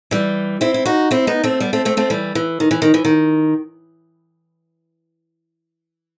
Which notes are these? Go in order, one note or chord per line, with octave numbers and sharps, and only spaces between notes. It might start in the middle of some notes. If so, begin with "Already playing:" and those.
E3 G3
C4 E4
E4
D#4 F#4
C4 E4
B3 D#4
A3 C4
G3 B3
A3 C4
A3 C4
A3 C4
E3 G3
E3
D#3
E3
D#3
E3
D#3